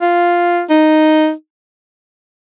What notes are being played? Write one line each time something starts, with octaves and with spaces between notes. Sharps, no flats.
F4
D#4